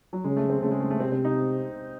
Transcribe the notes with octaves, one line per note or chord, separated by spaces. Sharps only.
F#3
C#3 G#3
A3
C4
C#3 A3
G#3
A3
A3
C3 C4
C4
D#4